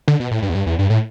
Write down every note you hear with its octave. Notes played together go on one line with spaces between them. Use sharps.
D3
B2
A2
G2
E2
G2
E2
G2
A2